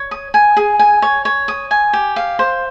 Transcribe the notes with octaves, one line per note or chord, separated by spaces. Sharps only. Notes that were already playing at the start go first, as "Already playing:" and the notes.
Already playing: C#5
D#6
G#5
G#4
G#5
C#5
C#5
D#6
G#5
G4
F5
C5